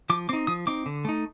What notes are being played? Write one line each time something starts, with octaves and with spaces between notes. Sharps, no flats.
F3 D6
C4 D#4 D6
F3 D#6
C4 D#4 D6
D3
A3 D#4